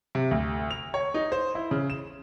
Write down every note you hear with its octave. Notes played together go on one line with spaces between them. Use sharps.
C3
D2
F7
C#5
D#4
C5
E4
C#3
E7